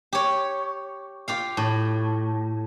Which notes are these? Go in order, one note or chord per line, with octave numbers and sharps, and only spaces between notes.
G4 C#5
F4 G4 F5
A2